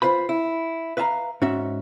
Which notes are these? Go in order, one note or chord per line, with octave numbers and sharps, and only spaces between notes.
F4 B4 C5 B5
E4
B4 E5 F5 A5 A#5
G#2 C#4 F#4 E5